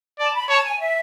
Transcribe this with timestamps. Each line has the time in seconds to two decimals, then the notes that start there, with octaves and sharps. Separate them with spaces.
0.19 D5 A5
0.35 B5
0.49 C#5 A5
0.65 G#5
0.80 E5